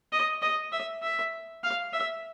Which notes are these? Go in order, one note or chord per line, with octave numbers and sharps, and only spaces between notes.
D#5
D#5
E5
E5
F5
E5